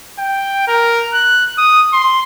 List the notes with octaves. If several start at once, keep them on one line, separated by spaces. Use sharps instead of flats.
G5
A#4
F#6
D#6
C6